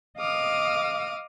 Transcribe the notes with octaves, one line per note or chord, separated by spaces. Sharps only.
D#5 F5 D6 D#6 F6